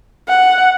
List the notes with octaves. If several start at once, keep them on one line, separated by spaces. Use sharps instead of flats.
F#5